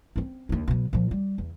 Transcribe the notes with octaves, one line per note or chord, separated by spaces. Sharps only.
C4 C#4
D#2 D4
B2 F#3
A#2 F3
G3
E2